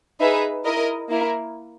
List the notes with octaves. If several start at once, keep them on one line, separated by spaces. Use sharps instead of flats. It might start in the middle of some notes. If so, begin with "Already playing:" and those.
D#4 G#4 B4 E5
E4 A#4 D#5
A#3 E4 A#4